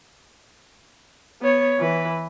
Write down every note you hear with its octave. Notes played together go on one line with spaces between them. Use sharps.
B3 C#5
E3 B4